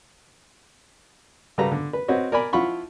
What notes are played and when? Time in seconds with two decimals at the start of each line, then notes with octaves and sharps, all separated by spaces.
1.58 C#3 G3 F#4 A4 B4 A#5
1.72 D3
1.93 B4
2.08 C4 F#4 B4 C#5 D#5
2.32 A#4 D5 G#5 B5
2.53 F3 E4 F4 F#5 B5 C#6